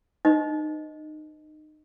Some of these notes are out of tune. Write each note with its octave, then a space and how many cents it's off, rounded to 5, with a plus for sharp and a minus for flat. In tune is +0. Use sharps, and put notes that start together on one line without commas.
D#4 -30 C5 -45 D#5 +0